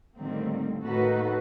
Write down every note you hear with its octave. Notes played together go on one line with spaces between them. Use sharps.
A2 D3 D#3 G3 A#3 C4
A2 A#3 D#4 F#4 A4 B4